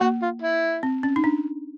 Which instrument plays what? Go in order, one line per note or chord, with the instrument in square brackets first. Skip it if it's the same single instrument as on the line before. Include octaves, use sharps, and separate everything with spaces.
[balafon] A#3 [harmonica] F#4
[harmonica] F4
E4
[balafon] C4
C#4
D#4
D4